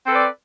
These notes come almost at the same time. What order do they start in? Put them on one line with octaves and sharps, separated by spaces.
C4 A4 B4 D5